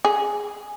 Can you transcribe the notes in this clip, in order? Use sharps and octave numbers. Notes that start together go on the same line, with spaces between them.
G#4